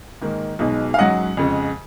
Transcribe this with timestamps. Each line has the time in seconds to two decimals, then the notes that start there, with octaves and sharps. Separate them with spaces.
0.22 G#2 D#3 A#3
0.59 B1 B2 G#3 D#4
0.94 F5
0.98 G#2 F#3 C#4 D#5 F#5
1.37 F2 C#3 G#3